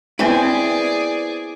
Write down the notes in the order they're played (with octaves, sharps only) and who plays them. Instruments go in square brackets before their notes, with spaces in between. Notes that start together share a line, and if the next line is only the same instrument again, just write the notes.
[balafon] B3 C4 G5 [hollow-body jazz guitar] E4 B4 C5 [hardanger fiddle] G#4 D5